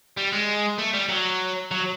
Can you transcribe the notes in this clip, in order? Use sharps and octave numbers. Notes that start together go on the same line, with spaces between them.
G3
G#3
A3
G3
F#3
F#3